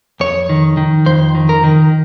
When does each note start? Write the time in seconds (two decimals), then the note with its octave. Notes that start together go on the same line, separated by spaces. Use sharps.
0.20 F2 C#5
0.49 D#3
0.77 D#3
1.06 F2 C5
1.35 D#3
1.49 A#4
1.64 D#3